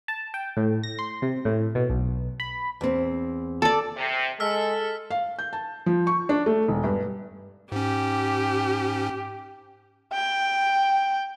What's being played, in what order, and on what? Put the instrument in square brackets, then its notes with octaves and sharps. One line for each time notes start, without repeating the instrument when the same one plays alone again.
[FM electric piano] A5
G5
A2
A#6
C6
C3
A2
B2
B1
B5
[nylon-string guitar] E2 C4
[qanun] A4 D5 [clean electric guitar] A5
[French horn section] C3
[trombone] G#3 [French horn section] A4 [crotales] E6 F6 B6
[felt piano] F5
G6
A5
F3
C#6
D4
A3
E1
G2
[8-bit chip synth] G#2 C#4 [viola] G4
[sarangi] G5